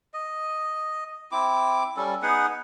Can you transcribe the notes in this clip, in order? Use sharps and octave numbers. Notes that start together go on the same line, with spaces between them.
D#5
C4 E4 D6
G3 C#4 A4
B3 D#4 G#4 F#5